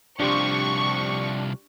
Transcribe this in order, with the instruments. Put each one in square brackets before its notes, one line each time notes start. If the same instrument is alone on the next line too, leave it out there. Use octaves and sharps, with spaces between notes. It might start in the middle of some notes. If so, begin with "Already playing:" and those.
[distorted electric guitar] C2 F3 [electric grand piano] D4 G4 C6 [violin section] C#6